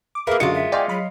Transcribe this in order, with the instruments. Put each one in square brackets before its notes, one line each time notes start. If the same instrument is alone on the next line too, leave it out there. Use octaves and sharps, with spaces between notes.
[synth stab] D6
[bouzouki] A#3 E4 [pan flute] G#4 [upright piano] A#4 B4 F5
[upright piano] F#2 D3 C#7 [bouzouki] G#3 F4 [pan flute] F#4
[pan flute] E5
[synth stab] D5 G5 G#5 [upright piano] D#5 F5 C6
[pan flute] F#3 [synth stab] B5